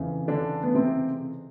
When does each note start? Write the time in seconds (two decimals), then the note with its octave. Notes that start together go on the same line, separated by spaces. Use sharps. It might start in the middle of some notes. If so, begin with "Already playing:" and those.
Already playing: F2 C#3 E3
0.28 D3 D4
0.63 B3
0.74 C3 C4